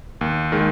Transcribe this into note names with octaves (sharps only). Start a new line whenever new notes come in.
D#2
D#3 G#3